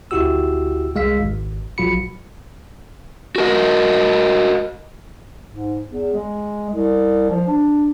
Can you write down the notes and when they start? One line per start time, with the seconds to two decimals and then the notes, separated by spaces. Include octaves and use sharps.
0.11 D2 E4 F#4 G4 E6
0.95 C2 G#3 F5 E6 B6
1.20 G#1
1.78 A#1 F#3 F4 F#4 B5 C#7
3.36 F#4 A#4 D#5
5.51 G#2
5.89 E2
6.14 G#3
6.70 C2
7.30 F3
7.47 D4